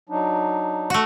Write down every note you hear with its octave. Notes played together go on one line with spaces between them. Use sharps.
F#3 D4 D#4
A3 F#4